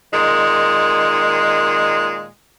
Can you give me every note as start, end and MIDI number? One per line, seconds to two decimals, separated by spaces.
0.13 2.28 46
0.13 2.28 51
0.13 2.28 56